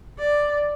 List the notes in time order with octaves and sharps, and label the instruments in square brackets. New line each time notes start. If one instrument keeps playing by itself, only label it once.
[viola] D5